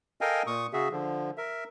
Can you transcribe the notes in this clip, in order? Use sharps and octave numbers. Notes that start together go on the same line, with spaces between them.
A4 A#4 D#5 F5 G5 G#5
A#2 C#6 D#6
C#3 F#4 G#4 E5
D3 F3
A#4 E5